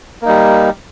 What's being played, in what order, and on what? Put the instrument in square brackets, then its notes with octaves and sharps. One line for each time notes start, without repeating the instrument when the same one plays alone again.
[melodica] A#3
D#4
G3